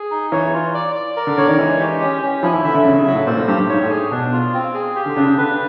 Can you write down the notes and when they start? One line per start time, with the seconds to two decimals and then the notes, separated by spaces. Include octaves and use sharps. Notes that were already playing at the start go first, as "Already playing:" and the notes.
Already playing: G#4
0.11 D#4
0.32 E3 C#5
0.53 F4
0.74 D5
0.96 D5
1.16 A#4
1.27 D3
1.38 D3 C#5
1.48 D#3
1.58 E3 G#3
1.80 G4
2.01 C#4
2.22 C#4
2.43 F3 E4
2.54 E3
2.64 D3 E5
2.74 D3
2.85 C#3 F#3
2.99 C#3
3.06 F#3
3.13 A2
3.26 A#2 C5
3.37 A2
3.48 G2 G4
3.59 G2
3.69 G#2 C#5
3.83 A2
3.90 G#4
4.11 B2 D4
4.32 F4
4.54 C4
4.74 G#4
4.96 G4
5.06 D3
5.16 C#3 D4
5.27 C#3
5.37 D3 B4